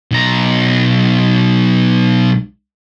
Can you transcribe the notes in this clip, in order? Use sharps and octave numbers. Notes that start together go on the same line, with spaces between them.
B1 A#5